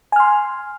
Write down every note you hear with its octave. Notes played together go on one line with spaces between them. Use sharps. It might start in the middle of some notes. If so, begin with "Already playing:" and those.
G#5 C6 F6